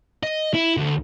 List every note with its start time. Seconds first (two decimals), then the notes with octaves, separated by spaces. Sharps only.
0.23 D#5
0.54 E4
0.77 D2